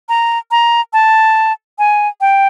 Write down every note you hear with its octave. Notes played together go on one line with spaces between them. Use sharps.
A#5
A#5
A5
G#5
G5